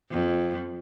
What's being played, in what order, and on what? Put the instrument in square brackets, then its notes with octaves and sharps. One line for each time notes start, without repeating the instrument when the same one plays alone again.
[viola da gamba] F2